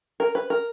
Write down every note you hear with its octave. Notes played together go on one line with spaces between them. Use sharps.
A#4
B4
A#4